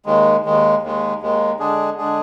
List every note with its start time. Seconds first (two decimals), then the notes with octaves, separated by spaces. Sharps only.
0.06 D#2 D#3 G#3
0.45 D#2 D#3 G#3
0.83 D#2 D#3 G#3
1.22 D#2 D#3 G#3
1.59 D3 G#3 D4 G#4
1.98 D3 G#3 D4 G#4